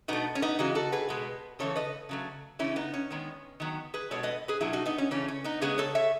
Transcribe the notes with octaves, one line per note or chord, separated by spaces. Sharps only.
B2 A3 B3 D#4
C#4
B3 D#4
C#3 E3 G#3 D#4 F#4
F#4 A4
G#4 B4
B2 G#3 B3
C#3 E3 A3 A4 C#5
B4 D#5
C#3 F#3 A3
C#3 E3 A3 C#4 E4
B3 D#4
C#4
D#3 G#3 B3
D#3 F#3 B3
G#4 B4
B2 G#3 B3 A4 C#5
B4 D#5
G#4 B4
B2 F#3 A3 E4 G#4
D#4 F#4
B3 D#4
C#4
C#3 E3 A3 C#4
C#4
B3 D#4
C#3 G#3 B3 G#4 B4
A4 C#5
C#5 E5